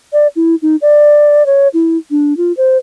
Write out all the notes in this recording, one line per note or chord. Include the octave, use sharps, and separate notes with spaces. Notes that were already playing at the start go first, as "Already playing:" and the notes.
D5
E4
D#4
D5
C#5
E4
D4
F4
C5